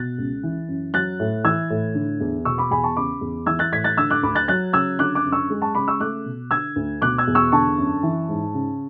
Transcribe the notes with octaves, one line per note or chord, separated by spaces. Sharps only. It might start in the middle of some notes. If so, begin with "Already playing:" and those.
Already playing: B2 F#6 A6
C#2
E3
F#2
F#3 F#6 A6
A2
E3 E6 G#6
A2
D3
E2
B2 C#6 E6
B5 D6
E2 G#5 B5
A5 C#6
C#3 B5 D6
E2
E3 E6 G#6
F#6 A6
A2 G#6 B6
F#6 A6
D3 E6 G#6
D6 F#6
D2 B5 D6
F#6 A6
F#3 F#6 A6
C#3 E6 G#6
D3 D6 F#6
D6 F#6
F#2
C#6 E6
G#3
A5 C#6
C#3 B5 D6
C#6 E6
A3 D6 F#6
B2
D3 E6 G#6
D2
B2 D6 F#6
E6 G#6
E2
C#6 E6
D3 A5 C#6
F#2
E3
G#2
C#3